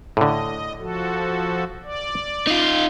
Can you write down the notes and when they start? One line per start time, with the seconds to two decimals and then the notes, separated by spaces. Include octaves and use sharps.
0.17 A2 D3 D#5
0.79 F3 F#4 A4
1.83 D5
2.47 D#4 F4